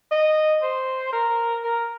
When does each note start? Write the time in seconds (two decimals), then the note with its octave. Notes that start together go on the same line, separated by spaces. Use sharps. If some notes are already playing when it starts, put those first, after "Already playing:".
0.11 D#5
0.63 C5
1.13 A#4
1.64 A#4